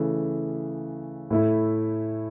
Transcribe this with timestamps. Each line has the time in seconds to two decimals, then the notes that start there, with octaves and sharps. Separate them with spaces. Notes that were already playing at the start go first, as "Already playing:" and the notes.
Already playing: C#3 E3 A3
1.30 A2 A3 E4